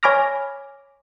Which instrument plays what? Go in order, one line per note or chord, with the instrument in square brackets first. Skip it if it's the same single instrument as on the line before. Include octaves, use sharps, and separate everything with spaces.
[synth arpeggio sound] C#5 G#5 B5 D6 F6 A#6